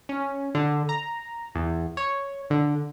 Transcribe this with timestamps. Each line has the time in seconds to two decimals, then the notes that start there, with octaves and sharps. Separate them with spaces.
0.09 C#4
0.55 D3
0.89 A#5
1.55 E2
1.97 C#5
2.50 D3